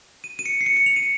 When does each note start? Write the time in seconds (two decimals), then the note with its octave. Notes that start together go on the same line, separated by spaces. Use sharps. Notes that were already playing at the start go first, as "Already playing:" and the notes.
0.24 D#7
0.39 D#7
0.46 C#7
0.61 C7
0.66 C#7
0.77 C#7
0.86 F7
0.96 D#7